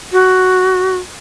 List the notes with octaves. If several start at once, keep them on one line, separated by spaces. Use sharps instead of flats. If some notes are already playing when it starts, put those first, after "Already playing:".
F#4